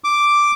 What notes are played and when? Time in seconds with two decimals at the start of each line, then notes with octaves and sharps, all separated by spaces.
0.04 D6